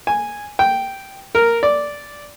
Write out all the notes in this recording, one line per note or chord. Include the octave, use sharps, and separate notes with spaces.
G#5
G5
A#4
D5